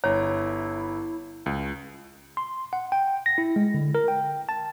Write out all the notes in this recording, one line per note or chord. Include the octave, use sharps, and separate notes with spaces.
G1 E4 C#5 A#5
C#2
C6
F#5
G5
A#6
E4
G#3
D3
A#4
G5
A5